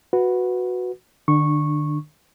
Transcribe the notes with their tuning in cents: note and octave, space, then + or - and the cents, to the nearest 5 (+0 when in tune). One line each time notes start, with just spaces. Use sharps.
F#4 -10 B4 +0
D3 +45 D4 +15 C#6 -10